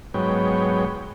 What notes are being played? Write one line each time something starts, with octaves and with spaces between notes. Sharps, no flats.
G#2 F#3 B3 C#5 G5